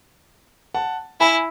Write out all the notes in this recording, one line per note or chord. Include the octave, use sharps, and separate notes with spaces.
F#5 A5
E4 G#5 B5